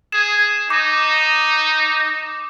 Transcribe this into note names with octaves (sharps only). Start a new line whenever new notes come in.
G#4 E7
D#4 D6